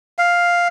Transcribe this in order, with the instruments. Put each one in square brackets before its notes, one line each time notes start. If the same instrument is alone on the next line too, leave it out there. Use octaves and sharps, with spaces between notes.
[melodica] F5